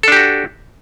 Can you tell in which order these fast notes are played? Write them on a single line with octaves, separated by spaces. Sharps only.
A4 D4 G4 F#4